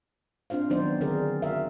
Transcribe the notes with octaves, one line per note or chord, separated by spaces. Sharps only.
C4 D4 F4 C5 F5
D#3 F#3 B3 D#4 C5 D5
D3 D#3 C4 G#4 A#4 D5
F#4 A#4 E5 F5